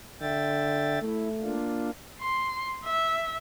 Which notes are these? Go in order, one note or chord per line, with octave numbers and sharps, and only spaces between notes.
D3 E5 G5 A6
A3 E4
A#3 D4 F4
C6
E5